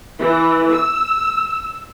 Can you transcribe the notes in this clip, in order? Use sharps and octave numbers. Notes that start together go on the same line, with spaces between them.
E3
E6